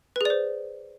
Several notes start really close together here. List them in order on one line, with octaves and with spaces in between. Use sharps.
B4 G#4 D5 C5